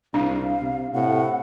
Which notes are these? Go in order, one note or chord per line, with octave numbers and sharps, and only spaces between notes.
C2 D4 F5
C3
A2 C3 F#5